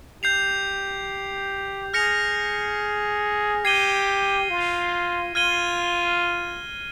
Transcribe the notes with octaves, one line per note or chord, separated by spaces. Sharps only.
G4 G6 C7 F7
G#4 F6 A#6 C#7 F7
G4 G#6 C7 D#7 G7
F4
F4 F6 G#6 D#7 G7